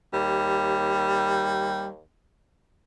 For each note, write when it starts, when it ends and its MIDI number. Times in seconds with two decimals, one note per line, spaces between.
0.13 2.03 39
0.13 1.88 55